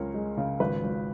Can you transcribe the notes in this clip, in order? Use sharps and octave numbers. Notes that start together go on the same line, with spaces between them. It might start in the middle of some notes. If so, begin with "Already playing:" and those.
Already playing: C#2 C#4 A#4 C#5
G#3
C#3
G#1 B4
G#1